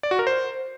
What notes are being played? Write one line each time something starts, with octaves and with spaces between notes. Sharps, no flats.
D5
F#4
A#4
C5